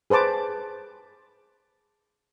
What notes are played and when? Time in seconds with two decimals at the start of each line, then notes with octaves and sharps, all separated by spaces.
0.10 G#4 B4 C5 A5 D6